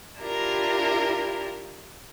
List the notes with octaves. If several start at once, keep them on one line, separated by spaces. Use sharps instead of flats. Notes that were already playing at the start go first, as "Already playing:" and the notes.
D4 E4 F4 G4 A#4 A#5